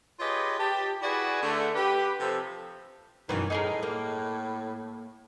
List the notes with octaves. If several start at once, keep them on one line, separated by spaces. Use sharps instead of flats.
F4 G4 G#4 B4 C#5 D#5
G4 A5
E4 F#4 G#4 B4 D5
D3 A3
G4 B4
C3 F3 A4
F#2 B2 D#3 E3
A2 D#4 G#4 A#4
A#3